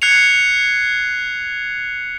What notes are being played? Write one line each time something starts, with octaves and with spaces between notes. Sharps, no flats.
F#6 G#6 C7 C#7 F7